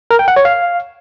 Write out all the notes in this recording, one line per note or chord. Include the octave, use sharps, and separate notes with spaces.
A#4
G5
F#5
C#5
F5